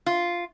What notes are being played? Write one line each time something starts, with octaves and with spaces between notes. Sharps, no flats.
F4